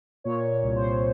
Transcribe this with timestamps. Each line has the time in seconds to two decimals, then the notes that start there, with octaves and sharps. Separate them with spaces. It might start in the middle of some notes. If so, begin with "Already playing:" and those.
0.24 A#2 C#5
0.63 C2
0.76 C5